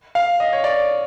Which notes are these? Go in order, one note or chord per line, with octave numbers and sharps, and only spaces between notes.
F5
D#5
C#5
D5